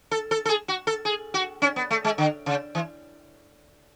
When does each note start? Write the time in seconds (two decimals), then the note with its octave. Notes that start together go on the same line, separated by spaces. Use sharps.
0.11 A4
0.31 A4
0.45 A4
0.49 G#4
0.68 F#4
0.87 A4
1.05 G#4
1.34 F#4
1.62 C#4
1.76 B3
1.91 A3
2.05 G#3
2.18 D3
2.46 C#3
2.75 E3